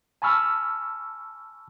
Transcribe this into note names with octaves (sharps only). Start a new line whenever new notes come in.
G#5 A5 B5 C#6 E6 F6